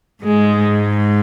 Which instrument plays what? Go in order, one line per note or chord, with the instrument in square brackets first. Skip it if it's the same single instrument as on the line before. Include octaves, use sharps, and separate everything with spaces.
[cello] G#2 [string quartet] G#3